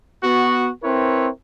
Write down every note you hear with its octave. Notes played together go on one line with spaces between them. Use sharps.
B3 F#4
C4 E4 A#4 B4 C#5